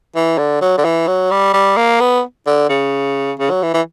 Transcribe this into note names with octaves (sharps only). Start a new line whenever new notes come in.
E3
D3
F#3
D3
E3
F#3
G3
G3
A#3
B3
D3
C#3
C#3
F#3
E3
E3